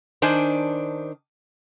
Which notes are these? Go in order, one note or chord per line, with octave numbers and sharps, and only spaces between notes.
D#3 D4 C5 G#5